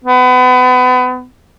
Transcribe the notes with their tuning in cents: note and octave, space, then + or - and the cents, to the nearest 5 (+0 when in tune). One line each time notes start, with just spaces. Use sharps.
B3 +30